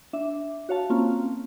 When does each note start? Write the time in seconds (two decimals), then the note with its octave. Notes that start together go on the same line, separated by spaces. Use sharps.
0.13 D4 E5
0.69 F#4 C#5 F5 A5
0.90 A#3 C4 C#4 F4